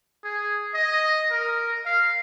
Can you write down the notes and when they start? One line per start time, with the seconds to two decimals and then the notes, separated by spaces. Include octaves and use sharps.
0.25 G#4
0.74 D#5
1.31 A#4
1.85 F5